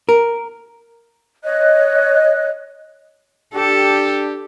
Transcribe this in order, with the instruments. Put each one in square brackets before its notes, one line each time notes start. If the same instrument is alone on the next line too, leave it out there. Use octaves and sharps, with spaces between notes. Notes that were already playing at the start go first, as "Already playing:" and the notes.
[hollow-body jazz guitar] A#4
[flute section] C#5 D#5 F#6
[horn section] D4 G4 [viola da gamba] A4